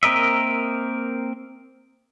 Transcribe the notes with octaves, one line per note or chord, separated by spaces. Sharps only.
A#3 C4 A#4 D#5 E5